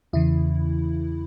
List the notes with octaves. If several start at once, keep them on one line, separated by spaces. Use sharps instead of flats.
E2 C#3 E3 E4